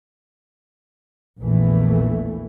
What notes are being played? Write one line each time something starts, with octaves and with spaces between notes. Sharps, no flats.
A#1 E2 E3 A3